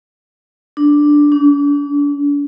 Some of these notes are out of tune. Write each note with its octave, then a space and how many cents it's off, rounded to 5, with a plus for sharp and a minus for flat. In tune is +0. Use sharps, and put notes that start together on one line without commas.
D4 +0
D4 -40